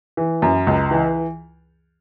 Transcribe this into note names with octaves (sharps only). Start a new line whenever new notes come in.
E3
F#2
C#2
E3